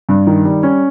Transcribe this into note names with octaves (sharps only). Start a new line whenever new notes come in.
G2
D#3
G3
C#4